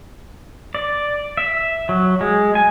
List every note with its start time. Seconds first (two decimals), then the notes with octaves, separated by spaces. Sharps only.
0.75 D5
1.37 E5
1.89 F#3
2.21 G#3
2.55 G#5